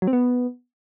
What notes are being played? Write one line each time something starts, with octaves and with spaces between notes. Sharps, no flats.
F#3
C4
B3